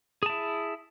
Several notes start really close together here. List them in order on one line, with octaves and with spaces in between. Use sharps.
G#4 A5 E4